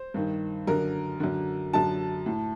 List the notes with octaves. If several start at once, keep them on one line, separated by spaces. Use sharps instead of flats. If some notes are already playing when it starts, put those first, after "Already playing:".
Already playing: C5
G2 D#3
F#2 D3 A#4
F#2 D3
F#2 D3 A5
A2